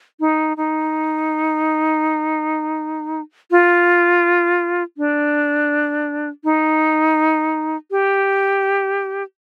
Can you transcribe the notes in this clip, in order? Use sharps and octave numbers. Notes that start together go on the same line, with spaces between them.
D#4
D#4
F4
D4
D#4
G4